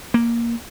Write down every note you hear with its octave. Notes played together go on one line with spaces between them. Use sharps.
A#3